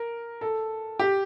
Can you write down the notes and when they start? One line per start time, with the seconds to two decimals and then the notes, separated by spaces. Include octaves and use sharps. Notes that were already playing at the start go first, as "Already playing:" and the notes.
Already playing: A#4
0.41 A4
0.99 G4